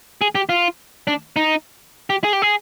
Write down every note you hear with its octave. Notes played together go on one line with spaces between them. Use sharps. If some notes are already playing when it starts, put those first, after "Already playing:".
G#4
G4
F4
D4
D#4
G4
G#4
G4
G#4